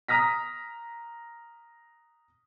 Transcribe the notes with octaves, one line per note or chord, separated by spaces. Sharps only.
A#5 D#6 F6 A#6 B6